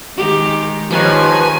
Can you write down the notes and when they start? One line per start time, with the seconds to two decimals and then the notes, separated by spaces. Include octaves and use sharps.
0.17 D#3 G#3 G4
0.91 D#3 F3 G4 B4 C#5 G#5